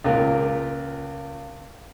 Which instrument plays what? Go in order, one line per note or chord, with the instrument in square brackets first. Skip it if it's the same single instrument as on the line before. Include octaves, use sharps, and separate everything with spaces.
[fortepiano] C#2 A#2 A#4